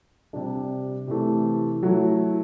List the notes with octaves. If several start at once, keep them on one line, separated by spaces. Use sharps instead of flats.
C3 G3 D4
C3 E3 A3
F#3 A3 E4